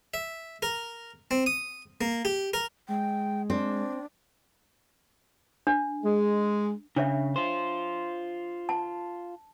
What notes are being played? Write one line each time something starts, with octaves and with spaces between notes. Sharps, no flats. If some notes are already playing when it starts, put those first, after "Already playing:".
E5
A#4
C4
D#6
A#3
G4
A#4
G#3 G5
C4 D4
D4
G#3
C#3 D4 C#5 E5
F4 C5
A5